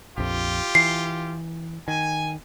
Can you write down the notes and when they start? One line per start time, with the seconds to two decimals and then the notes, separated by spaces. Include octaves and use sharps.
0.18 A#1 F2 F4 G4
0.75 E3 C7
1.88 D#3 G#5